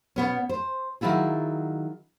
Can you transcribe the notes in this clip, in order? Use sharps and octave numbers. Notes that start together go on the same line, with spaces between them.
B2 B3 C#4
C5
D#3 F#3 E4 F4 G#4